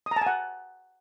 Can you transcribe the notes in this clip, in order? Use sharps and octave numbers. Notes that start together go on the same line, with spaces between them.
D#6
A#5
A5
G#5
F#5